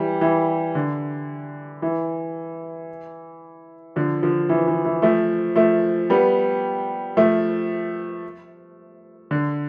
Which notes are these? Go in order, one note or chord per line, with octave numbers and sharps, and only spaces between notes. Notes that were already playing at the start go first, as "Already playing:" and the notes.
Already playing: E3 G3
E3
D3
E3
D3 F3
D3 F3
E3
E3
E3
F3 A3
F3 A3
G3 B3
F3 A3
D3